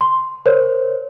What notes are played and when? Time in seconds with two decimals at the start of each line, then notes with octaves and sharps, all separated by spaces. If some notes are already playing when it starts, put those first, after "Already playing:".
0.01 C6
0.46 A#4 C5 C#5